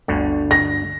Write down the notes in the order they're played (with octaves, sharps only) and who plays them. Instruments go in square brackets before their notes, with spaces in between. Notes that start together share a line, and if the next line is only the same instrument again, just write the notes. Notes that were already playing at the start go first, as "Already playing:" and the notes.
[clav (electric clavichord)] G1 D2 D3
[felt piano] A#6